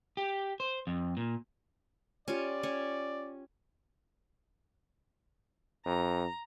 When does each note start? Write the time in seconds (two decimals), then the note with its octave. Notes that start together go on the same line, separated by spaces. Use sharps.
0.17 G4
0.60 C5
0.87 F2
1.17 A#2
2.28 C#4 F4 G4 D5
2.63 C#4
5.86 F2 A#5